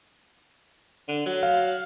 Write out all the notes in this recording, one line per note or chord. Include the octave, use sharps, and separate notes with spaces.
D3
F#3
F5